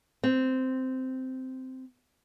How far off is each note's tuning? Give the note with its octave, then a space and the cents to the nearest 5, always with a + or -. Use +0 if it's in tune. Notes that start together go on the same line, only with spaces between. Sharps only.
C4 -10